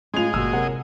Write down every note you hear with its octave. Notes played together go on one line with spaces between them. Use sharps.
A2 G#3 C#4 F4 G#4 D#5 F7
G1 A#2 F#4 E6
C3 A#4 C#5 F#5